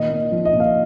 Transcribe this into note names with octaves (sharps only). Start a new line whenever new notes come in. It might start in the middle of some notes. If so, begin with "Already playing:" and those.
Already playing: A#2 D#3 D#5
A#2
F3
D#5
A#2
F5